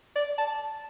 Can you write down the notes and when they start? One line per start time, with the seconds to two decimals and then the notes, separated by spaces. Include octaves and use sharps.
0.16 D5
0.38 A5